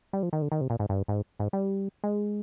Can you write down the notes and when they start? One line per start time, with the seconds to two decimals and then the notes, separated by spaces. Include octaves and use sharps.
0.13 G3
0.23 F3
0.33 D#3
0.42 D3
0.52 D#3
0.61 C3
0.70 A#2
0.79 G#2
0.89 G2
1.08 G#2
1.40 G#2
1.53 G3
2.04 G#3